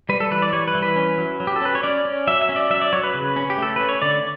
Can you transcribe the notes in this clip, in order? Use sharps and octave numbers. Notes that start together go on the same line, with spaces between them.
G3 B4
A4
E3 B4
D5
G3 C#5
B4
E3
B4
C#4
F#3
F#3
G4
A4
C#4 B4
C#5
C#4 D5
C#4
F#3 E5
E5
C#4
D5
F#3 E5
D5
F#3 C#5
B4
C#3
C#4
G4
A3 A4
C#4 B4
C#5
D3 D5